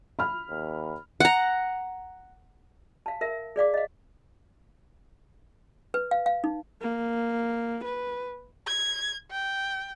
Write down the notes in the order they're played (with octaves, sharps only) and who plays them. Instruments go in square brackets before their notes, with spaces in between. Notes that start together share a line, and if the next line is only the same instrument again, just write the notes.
[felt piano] B5 F6
[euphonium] D#2
[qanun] F#5 A#5
[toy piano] F5 A5
A#4 E5
G#4 D5 F5 D6
D#5 F5
B4
F5
F5
D#4
[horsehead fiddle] A#3
B4
[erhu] G#6
G5